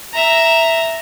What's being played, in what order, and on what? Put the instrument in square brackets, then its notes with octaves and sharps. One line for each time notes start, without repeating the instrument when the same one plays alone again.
[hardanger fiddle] E5 A#5